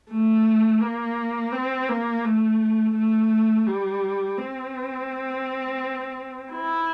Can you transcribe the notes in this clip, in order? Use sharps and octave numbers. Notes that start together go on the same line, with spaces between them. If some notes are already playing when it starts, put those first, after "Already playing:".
A3
A#3
C4
A#3
A3
A3
G3
C4
E4